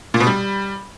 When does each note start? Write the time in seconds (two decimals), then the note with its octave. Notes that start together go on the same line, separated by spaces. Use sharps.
0.14 A#2
0.20 B2
0.27 G3